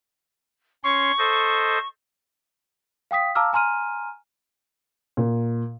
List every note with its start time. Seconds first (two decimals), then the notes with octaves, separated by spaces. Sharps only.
0.84 C#4 C#5 C6 C#6
1.18 A4 C5 D#5
3.11 F5 G5 D#6 B6
3.35 F5 A5 A#5 D6 E6 F6
3.53 G#5 A#5 C6 F6 D#7
5.17 A#2